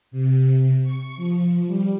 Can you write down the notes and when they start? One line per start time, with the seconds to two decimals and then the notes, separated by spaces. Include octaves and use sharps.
0.11 C3
0.83 C#6
1.16 F3
1.67 G3